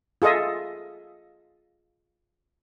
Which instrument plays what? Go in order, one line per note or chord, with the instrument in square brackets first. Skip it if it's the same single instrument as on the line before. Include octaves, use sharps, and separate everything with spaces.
[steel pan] F4 G#4 A4 D#5 E5